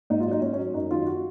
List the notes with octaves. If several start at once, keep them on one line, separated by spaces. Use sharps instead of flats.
G#2 D#4
F4
F#3
D#4
G#2 C#4
C#4
F#3
F#2 D#4
D#3 F#3 F4
F#4